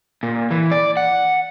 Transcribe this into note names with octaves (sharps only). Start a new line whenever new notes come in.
A#2
E3
D5
F#5